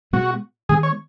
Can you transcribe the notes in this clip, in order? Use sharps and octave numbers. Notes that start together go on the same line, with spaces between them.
B2 G#3 B3 F#4
D#3 G#3 B3 G#4
C#5